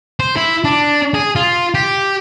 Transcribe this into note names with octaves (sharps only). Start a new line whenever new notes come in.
C5
E4
D4
G#4
F4
G4